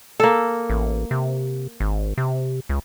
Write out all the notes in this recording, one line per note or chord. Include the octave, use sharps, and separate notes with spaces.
A#3 A4
A1
C3
G#1
C3
C#2